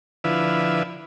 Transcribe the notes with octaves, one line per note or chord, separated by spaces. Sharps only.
D3 F3 E4 B4